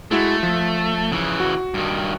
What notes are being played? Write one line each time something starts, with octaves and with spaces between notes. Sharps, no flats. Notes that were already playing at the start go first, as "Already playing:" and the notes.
G#3 A3 E4 F#4
F3
C#3 E3
F#4
G2 D#3